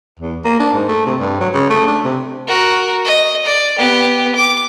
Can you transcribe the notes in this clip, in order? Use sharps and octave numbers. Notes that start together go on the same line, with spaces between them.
E2
A#3
D4
G#2
A3
C3
G2
F#3
C#3
A3
D4
C3
F#4 A#4
D#5
D5
B3 G4
D6